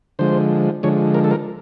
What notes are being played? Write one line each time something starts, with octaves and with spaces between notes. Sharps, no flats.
D3 F3 G#3 C5
D3 F3 G#3 C#5
A#4
A4
A#4